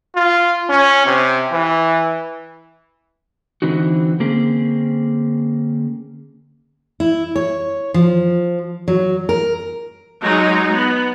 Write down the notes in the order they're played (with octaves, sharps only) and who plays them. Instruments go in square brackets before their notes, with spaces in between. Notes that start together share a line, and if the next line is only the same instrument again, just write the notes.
[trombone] F4
C#4
C3
E3
[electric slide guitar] D3 E3 C4 D#4 F#4
D3 A#3 C4 C#4 G#4
[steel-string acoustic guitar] E4
C#5
F3
F#3
A#4
[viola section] F#3 G#3 D#4
B3